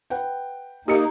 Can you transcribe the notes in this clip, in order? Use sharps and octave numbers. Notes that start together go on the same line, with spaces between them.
B4 F#5 G5
A#3 D#4 G4 D#6 C#7